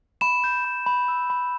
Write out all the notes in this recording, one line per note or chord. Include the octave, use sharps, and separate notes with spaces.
B5 E7
G6
B5
B5
E6
B5